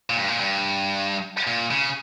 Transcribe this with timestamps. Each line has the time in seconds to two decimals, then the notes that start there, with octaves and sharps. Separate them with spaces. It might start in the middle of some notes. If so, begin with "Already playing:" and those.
0.10 A#2
0.17 G2
0.28 A#2
0.40 G2
1.47 A#2
1.71 C#3